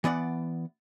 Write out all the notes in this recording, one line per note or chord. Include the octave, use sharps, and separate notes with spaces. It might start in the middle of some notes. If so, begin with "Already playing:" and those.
E3 B3 D5 F#5